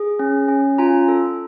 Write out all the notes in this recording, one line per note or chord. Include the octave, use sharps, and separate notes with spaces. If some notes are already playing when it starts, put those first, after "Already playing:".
Already playing: G#4
C#4
C#4
F4 G#5 A#5
A4